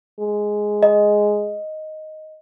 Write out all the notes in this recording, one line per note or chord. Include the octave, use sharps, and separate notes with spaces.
G#3
D#5